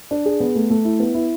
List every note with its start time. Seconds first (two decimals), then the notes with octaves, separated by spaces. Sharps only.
0.11 D4
0.26 G#4
0.40 B3
0.55 A3
0.70 A3
0.85 E4
1.00 B3
1.14 E4